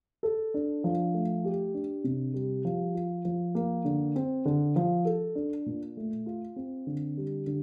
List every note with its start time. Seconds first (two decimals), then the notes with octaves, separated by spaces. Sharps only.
0.23 A4
0.54 D4
0.84 F3
1.14 A3
1.44 G4
1.74 D4
2.04 C3
2.34 G3
2.65 F3
2.94 F4
3.25 F3
3.55 A#3
3.85 D3
4.16 C4
4.45 D3
4.76 F3
5.05 A4
5.35 D4
5.66 A#2
5.97 A3
6.26 F4
6.56 C4
6.87 D3
7.17 G3
7.47 D3